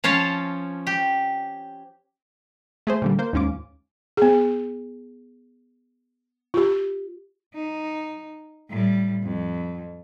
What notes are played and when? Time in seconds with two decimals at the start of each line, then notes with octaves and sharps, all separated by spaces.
0.04 F3 C#4 C#5 F5 A5
0.87 G4
2.87 A3 G#4 C5
3.02 A#2 D3 G3
3.19 A#3 C5
3.33 D#2 G#2 C#4 F4 D6
4.17 B3 G#4
6.54 F4 G4
7.55 D#4
8.70 A2 G3
9.23 F2